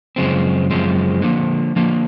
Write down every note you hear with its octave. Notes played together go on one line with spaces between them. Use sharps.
F#2 C#3 F3 G#3 C4
F#2 C#3 F3 G#3 C4
D3 F3 A#3
D3 F3 A#3